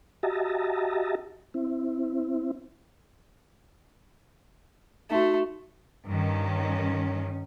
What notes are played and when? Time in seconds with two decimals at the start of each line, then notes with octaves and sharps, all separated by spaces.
0.23 F#4 G4 D#5 E5 A5 A#5
1.54 C4 E4
5.10 A3 D#4 F#4
6.07 G2 D#3 C#4